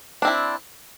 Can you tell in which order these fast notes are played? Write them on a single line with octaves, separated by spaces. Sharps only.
D4 C4 E4